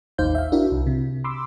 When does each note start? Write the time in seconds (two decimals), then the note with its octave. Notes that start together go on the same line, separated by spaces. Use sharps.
0.18 A1 D#2 D#4 C5 F5 G6
0.35 E5 F5
0.52 D4 E4 F#4 A#4 E5
0.72 C2
0.87 C3
1.24 B5 C6 D6 E6